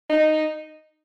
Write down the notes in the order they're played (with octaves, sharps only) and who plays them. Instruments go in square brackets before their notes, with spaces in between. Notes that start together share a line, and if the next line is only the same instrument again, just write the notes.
[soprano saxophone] D#4